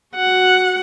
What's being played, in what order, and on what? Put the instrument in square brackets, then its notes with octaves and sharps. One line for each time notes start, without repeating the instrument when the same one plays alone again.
[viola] F#4 F#5